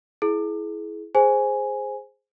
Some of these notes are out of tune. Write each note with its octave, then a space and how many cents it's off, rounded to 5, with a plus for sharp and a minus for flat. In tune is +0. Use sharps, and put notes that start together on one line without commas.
E4 +0 G#4 +30
G#4 +0 C5 +0 G#5 +0